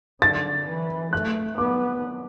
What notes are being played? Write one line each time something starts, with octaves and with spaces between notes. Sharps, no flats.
D3 A6
E3
A3 F#6
B3 D6